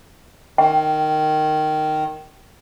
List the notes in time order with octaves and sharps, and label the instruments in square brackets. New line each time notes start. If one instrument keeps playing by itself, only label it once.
[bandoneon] D#3 [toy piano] G5